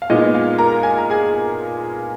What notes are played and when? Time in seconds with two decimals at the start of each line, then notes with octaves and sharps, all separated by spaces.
0.02 F5
0.10 A#2 G#3 B3 D#4 D#5
0.34 F4 F5
0.58 A#4 A#5
0.83 G#5
0.98 A#5
1.10 G#4 G#5